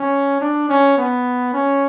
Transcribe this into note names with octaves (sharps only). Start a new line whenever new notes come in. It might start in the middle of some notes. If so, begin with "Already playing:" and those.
Already playing: C#4
D4
C#4
B3
C#4